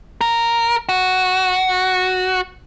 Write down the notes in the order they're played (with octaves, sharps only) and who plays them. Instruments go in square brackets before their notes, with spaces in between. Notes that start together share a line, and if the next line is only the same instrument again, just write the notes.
[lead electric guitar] A#4
F#4